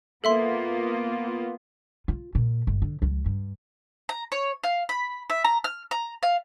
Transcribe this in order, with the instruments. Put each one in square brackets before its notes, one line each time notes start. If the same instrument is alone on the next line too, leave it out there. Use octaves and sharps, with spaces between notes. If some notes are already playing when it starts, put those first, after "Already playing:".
[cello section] A#3 B3 F4 [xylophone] A4 E5 C6
[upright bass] F4
A#2
G1
D3
C#2 F3
G2
[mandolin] A#5
C#5
F5
B5
E5
A#5
F6
A#5
F5